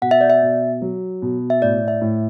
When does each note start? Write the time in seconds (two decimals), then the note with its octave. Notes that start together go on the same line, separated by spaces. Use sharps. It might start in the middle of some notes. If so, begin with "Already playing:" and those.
0.02 B2 F#5
0.11 E5
0.21 D5
0.30 E5
0.42 B2
0.82 F#3
1.22 B2
1.50 E5
1.62 A2 D5
1.88 E5
2.01 A2